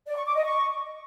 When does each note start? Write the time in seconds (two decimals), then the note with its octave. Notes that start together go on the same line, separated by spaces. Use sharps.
0.07 D5
0.16 C#6
0.26 D6
0.35 D#5
0.45 C#6